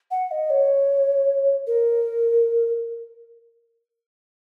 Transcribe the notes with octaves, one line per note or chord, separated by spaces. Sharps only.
F#5
D#5
C#5
A#4